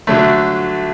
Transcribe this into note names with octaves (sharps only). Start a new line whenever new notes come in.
D3 F#3 A3